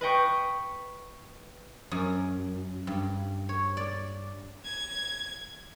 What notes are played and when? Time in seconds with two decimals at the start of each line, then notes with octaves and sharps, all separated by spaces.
0.01 B4 D#5 G5 C#6
1.91 F#2
2.87 G2
3.49 C#5
3.77 D5
4.65 G#6